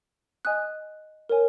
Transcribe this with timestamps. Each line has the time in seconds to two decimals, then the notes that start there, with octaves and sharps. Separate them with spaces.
0.45 D#5 G#5 D#6 F#6
1.30 A#4 C#5 G#5